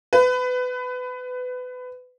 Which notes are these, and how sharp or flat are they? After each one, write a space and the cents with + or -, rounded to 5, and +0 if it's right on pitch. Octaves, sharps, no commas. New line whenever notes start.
B4 +25